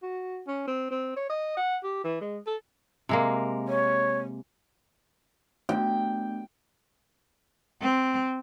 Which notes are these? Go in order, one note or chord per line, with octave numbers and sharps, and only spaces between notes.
F#4
C#4
C4
C4
C#5
D#5
F#5
G4
E3
G#3
A4
C3 G#3 A#3
C#5
A3 B3 D4 G5
C4